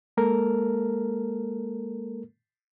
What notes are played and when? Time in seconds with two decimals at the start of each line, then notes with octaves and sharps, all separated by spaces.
0.17 G#3 A#3 A4 A#4